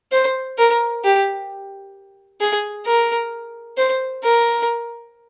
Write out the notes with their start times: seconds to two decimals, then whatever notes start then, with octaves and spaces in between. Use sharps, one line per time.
0.12 C5
0.58 A#4
1.04 G4
2.41 G#4
2.87 A#4
3.78 C5
4.23 A#4